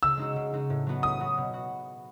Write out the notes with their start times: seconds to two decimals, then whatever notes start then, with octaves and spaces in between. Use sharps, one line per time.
0.03 C#3 E6
0.17 G#3 D#4 F#4
0.36 C#3
0.52 G#3 D#4 F#4
0.70 A2
0.86 F#3 B3 F#4
1.03 A2 D#6
1.20 F#3 B3 F#4
1.38 B2
1.54 F#4